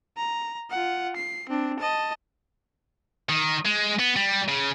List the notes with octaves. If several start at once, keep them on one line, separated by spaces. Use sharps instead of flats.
A#5
F4 F#5
C7
C4 D4
D#5 A5
D#3
G#3
B3
G3
C#3